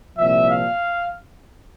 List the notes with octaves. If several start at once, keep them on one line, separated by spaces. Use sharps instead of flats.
C2 A#2 F3 E5
F5